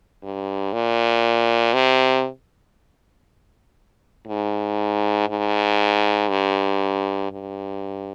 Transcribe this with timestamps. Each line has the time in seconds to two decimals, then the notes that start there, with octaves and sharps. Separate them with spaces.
0.23 G2
0.73 A#2
1.74 C3
4.27 G#2
5.29 G#2
6.30 G2
7.32 G2